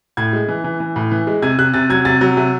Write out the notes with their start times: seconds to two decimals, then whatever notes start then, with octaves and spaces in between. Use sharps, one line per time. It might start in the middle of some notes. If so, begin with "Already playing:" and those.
0.17 A2 G#6
0.33 G#3
0.49 E3
0.64 E3
0.80 E3
0.96 A2
1.11 E3
1.27 G#3
1.42 C3 G#6
1.58 C3 F#6
1.74 C3 A6
1.90 F#3 G#6
2.05 C3 A6
2.21 F#3
2.37 C3